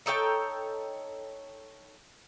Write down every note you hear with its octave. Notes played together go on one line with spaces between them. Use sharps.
D#4 A4 C#5 G5